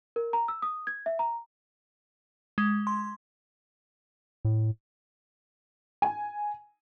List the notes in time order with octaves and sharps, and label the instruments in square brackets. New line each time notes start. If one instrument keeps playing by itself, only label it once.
[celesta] A#4
A#5
E6
D#6
G#6
E5
A#5
[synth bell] G#3
C6
[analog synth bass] A2
[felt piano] G#5